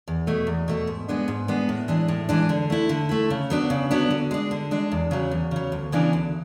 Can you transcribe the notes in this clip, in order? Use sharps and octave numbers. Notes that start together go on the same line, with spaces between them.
E2
B2 A3
E2
B2 A3
G#2
G#3 B3 D4
G#2
G#3 B3 D4
A2
E3 G#3 D4
A2
E3 G#3 D4
D3
A3 E4
D3
A3 E4
C#3
F#3 B3 D4
C#3
F#3 B3 D4
D3
G#3 D4
D3
G#3 D4
E2
C#3 F#3
E2
C#3 F#3
D2
C#3 E3 B3 D4
D2